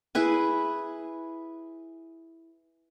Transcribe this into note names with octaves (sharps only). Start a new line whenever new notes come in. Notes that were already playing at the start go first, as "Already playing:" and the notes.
E4 G#4 B4 G#5